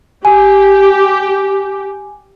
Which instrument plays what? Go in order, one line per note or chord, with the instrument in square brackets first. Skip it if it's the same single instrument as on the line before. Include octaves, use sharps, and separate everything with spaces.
[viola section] G4 [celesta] G#5